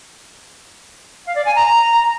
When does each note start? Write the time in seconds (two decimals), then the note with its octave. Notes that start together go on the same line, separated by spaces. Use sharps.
1.26 F5
1.35 D5
1.45 G#5
1.55 A#5